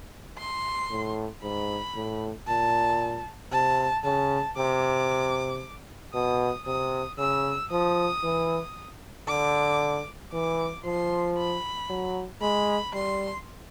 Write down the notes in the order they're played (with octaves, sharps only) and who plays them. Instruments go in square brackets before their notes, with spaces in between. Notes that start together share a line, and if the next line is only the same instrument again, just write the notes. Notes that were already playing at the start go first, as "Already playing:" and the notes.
[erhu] C6
[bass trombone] A2
[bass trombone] G#2 [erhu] B5
[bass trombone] A2
[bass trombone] A#2 [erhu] A5
[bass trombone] C3 [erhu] A5
[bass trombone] C#3 [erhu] A5
[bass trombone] C3 [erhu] D6
[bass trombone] B2 [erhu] D#6
[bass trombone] C3 [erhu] D#6
[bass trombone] C#3 [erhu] E6
[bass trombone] F3 [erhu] D#6
[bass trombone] E3
[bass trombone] D3 [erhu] D6
[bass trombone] E3 [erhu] D6
[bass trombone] F3 [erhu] C6
[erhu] B5
[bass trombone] F#3
[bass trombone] G#3 [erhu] B5
[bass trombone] G3 [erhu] C6